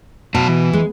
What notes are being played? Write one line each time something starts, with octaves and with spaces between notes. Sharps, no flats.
B2 F#3 A5
E3
G#3